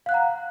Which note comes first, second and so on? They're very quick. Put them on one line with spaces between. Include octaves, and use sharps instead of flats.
F5 F#6 F#5 A#5